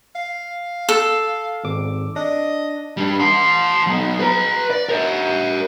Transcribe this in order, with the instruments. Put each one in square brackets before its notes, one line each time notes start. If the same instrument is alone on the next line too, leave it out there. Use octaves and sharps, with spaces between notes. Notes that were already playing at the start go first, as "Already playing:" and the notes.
[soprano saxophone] F5
[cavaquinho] A4
[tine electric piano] G#1 D6
[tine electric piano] D4 [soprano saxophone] D#5
[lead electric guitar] G3 D4
A5 C6
F#3 B3
B4 A#5
D5
A#4 C#5